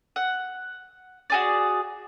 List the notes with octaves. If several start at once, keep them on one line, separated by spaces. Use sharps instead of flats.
F#5
F#4 G#4 D5